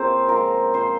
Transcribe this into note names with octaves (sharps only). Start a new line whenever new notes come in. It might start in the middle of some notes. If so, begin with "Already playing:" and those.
Already playing: C#3 A#3 C4 F4 A#4 C5
F3 G#3 A#4 A#5
F3 C5 C6